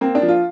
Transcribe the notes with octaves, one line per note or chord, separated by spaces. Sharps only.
A#3 C4
D4
F3
F4